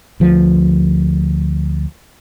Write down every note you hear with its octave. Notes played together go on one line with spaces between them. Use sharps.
D2 F3